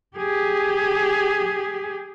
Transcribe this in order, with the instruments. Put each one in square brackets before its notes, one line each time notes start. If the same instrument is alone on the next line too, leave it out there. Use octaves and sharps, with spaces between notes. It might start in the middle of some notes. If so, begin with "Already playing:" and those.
[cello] G4 G#4